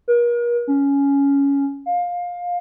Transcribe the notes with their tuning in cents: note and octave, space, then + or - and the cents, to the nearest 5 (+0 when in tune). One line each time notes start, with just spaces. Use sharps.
A#4 +40
C#4 +10
F5 +20